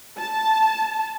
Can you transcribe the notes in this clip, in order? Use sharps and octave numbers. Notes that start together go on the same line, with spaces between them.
A5